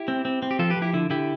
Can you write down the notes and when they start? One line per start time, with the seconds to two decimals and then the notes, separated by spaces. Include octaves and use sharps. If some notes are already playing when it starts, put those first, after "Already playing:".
Already playing: E4 G4
0.08 C4
0.25 C4
0.42 C4
0.51 G4
0.59 F3 F4 A4
0.70 G4 B4
0.77 F3
0.82 E4 G4
0.93 D3 E4
1.10 D3 E4 G4